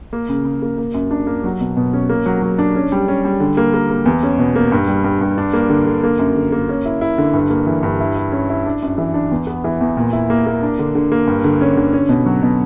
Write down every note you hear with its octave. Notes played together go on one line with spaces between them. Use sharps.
A#3
C#3
C#3
A#3
A#3
F#2
D4
A#3
F#3
B2
B2
C#4
A#3
F#3
F#3
D4
C#4
G3
C#4
G3
D3
A#3
A#3
A#3
E2
C#4
B2
A#3
G2
G3
G2
G2
D4
A#3
D3
D3
A#3
F#2
D3
A#3
C#4
E4
E4
D3
G2
A#3
E3
G2
E4
E4
C#4
E4
D4
F#2
E3
D4
E2
B3
E3
E2
A#2
E4
A#3
A#3
D4
D3
D3
A#3
G2
D3
C#4
D3
C#4
B2
F#3
B2